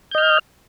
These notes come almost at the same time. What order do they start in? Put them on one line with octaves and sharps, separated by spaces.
G6 D#5 F6